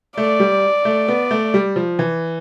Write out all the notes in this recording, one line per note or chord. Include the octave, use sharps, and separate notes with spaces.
A3 D5
G3
A3
B3
A3
G3
F3
E3